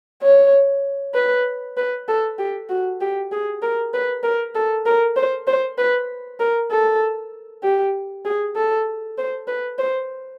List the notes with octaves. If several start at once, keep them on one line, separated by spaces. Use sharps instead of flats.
C#5
B4
B4
A4
G4
F#4
G4
G#4
A#4
B4
A#4
A4
A#4
C5
C5
B4
A#4
A4
G4
G#4
A4
C5
B4
C5